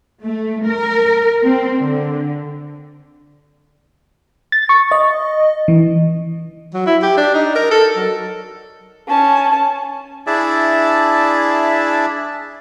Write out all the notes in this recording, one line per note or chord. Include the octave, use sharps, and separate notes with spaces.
A3
A#4
C4
D3
A6
C#6
D#5
E3
F#3
E4
G4
D4
D#4
A#4
A4
F#3
C#4 A5
D4 E4 G#4 D5 E5 A5